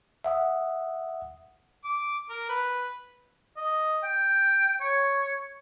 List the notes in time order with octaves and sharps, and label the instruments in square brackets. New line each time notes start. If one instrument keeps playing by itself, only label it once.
[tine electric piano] E5 F#5 D#6
[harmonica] D6
A#4
B4
[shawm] D#5
G5
C#5